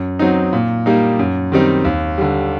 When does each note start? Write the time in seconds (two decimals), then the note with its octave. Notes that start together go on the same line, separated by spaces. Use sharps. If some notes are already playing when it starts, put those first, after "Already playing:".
Already playing: F#2
0.19 F#3 C4 D#4
0.53 A#2
0.86 G3 A#3 D#4
1.19 F#2
1.52 D#3 G3 C4 D#4
1.85 D#2
2.18 D3 G3